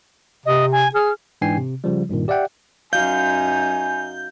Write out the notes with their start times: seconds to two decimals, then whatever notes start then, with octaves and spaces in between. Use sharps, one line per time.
0.46 C3 D#5
0.72 G#5
0.95 G#4 F6
1.41 G#2 E3 D4 G5 G#5 C7
1.57 C3
1.84 C#3 F3 G3
2.09 C2 G2 A#2 D#3
2.28 G4 D5 E5 F#5 G5
2.93 F#2 D#4 F#4 F5 G#5 G6